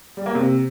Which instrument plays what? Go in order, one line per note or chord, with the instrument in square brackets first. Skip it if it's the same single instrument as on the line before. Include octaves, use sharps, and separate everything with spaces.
[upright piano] G3
A#3
C3